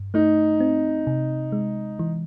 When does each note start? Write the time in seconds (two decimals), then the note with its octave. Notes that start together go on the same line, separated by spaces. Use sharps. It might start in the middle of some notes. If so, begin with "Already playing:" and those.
Already playing: G2
0.14 A3 D#4
0.60 C4
1.07 C3
1.52 G#3
1.99 E3